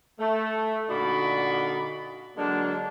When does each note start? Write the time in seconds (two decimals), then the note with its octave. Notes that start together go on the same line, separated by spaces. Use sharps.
0.20 A3
0.89 A#2 D3 D#4 F#4 D5 B5
2.37 D3 F#3 G#3 A#3 D4